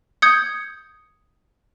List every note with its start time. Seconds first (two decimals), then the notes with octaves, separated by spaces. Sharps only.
0.22 D#6 G6 G#6 C#7